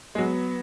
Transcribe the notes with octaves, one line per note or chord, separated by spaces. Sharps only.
G#3
F#3 B3